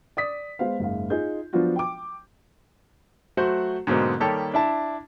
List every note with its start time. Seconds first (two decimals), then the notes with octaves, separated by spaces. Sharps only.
0.17 D5 D#6 B6
0.59 G#3 B3 C5 F5
0.79 F#1 G#2 F5
1.10 D#4 F4 G#4 G6
1.53 F3 F#3 B3 D4 F4 F#4
1.76 G5 D6
3.37 F#3 A3 F#4 C5 F#5
3.87 G#2 B2 D3 F#3 A#3 C4
4.20 D#3 G3 A#3 G4 A4 C#5
4.54 D4 E4 A5